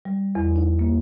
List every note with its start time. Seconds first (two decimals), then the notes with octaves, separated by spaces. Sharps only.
0.05 G3
0.35 E2
0.56 D#4
0.79 A#3